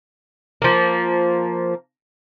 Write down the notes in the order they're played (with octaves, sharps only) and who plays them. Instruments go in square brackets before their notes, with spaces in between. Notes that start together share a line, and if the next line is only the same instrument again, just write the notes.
[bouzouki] F3 A#3